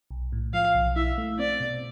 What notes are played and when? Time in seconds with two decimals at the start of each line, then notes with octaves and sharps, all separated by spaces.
0.11 B1
0.32 A2
0.54 F3 F5
0.75 B1
0.96 E4 E5
1.18 A3
1.39 C4 D5
1.60 B2